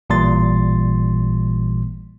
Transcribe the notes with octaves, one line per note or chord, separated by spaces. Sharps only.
A1 A#2 E3 G3 C6 A6